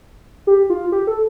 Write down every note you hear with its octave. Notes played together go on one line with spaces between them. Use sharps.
G4
F4
G4
A4